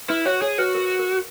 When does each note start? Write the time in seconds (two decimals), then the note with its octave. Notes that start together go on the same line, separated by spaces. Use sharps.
0.09 E4 B4
0.26 F#4 C#5
0.42 G#4 C#5
0.58 F#4 B4
0.75 A#4
0.99 A#4